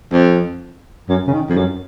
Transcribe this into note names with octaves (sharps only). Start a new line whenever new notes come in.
F2
F#2
C#3
D#3
F2
F#2